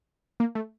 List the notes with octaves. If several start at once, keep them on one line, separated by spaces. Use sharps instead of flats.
A#3
A3